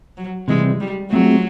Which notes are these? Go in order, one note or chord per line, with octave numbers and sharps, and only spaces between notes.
F#3
C3 E3 G3 G#3
G3
F#3 A3 C4 F4 G#4